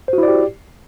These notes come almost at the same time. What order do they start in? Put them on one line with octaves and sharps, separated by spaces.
C5 F#4 E4 D5 G4